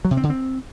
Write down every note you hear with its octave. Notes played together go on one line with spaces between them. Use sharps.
F#3
C3
C4
D3
C4